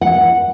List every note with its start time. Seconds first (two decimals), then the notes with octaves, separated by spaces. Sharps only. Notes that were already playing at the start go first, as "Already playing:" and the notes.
0.01 F#5